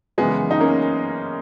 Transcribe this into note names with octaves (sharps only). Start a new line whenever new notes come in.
F#1 F#2 C#3 E3 G#3 B3
D#4
A#3 C#4